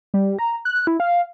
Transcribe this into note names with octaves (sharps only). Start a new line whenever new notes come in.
G3
A#5
F#6
E4
F5